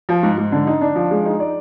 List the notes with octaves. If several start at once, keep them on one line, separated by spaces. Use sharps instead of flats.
F3
G#2
G#2
D3
D#4
D4
F3
G#3
D#4
D5